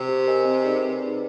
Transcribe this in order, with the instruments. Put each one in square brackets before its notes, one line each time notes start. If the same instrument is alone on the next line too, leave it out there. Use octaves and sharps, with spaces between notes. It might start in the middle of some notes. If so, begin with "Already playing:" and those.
Already playing: [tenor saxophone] C3
[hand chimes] G4
A#4 D#5 G#5
C4
D#4 G#4 B4 D5
C4
D#4 G#4 B4 D5